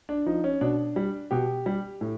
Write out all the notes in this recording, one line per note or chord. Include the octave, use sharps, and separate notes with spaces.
D4
F3 D#4
C#4
B2 D4
G3
B2 G4
G3
A2